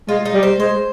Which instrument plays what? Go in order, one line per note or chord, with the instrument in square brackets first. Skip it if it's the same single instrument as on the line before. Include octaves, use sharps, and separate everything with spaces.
[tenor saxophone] G#3 [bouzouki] F4
[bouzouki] D#4
[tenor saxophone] G3
[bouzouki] C5
[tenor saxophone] G#3 [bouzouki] C5